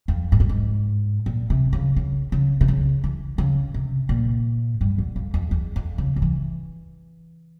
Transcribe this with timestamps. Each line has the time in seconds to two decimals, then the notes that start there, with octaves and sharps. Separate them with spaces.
0.08 F2
0.32 G#2
0.40 G2
0.49 G#2
1.26 A#2
1.50 C3
1.73 C#3
1.96 C#3
2.32 C#3
2.61 C3
2.68 C#3
3.04 E3
3.38 C#3
3.74 C3
4.09 A#2
4.81 G2
4.98 E2
5.16 F2
5.34 F2
5.51 E2
5.76 F2
5.98 C#3
6.16 C#3
6.22 E3